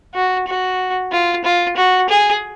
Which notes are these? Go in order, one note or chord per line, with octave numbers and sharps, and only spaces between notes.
F#4
F#4
F4
F4
F#4
G#4